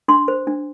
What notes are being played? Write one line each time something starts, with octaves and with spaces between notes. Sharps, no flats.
D4 C6
C5
D4